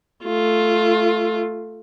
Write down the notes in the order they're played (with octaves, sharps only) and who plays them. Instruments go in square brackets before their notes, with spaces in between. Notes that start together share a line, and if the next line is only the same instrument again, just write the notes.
[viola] A3 F4